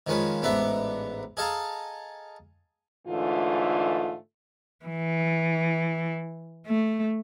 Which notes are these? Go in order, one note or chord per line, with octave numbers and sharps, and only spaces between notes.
D#3 F3 G#3 C#4 B4
A1 G#2 B3 D4 E5 A#5
G#4 A4 D#5 F5 A5 A#5
G#2 D3 E3 A3 F4
E3
A3